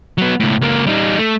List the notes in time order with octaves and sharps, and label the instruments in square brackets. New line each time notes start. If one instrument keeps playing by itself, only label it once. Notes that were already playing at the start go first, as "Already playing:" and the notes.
[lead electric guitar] F#3 B3
C#2 A2
C#2 A#3
G3 D#4
A3